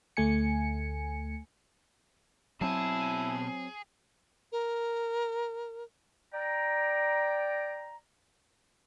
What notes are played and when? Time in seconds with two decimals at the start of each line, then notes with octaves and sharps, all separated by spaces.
0.17 D2 A3 G#5 C#7
2.61 B2 F#3 C4 E4 G#4 A5
4.52 A#4
6.34 D5 G5 A#5